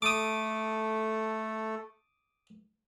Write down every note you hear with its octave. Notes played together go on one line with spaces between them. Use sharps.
A3 A4 D6 D#6